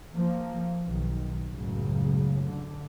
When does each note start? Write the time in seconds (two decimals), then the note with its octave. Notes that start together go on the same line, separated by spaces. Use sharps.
0.15 F3 A#3
0.83 B1 D#3
1.53 C#2 F#2 A2 C#3 F#3
2.44 D3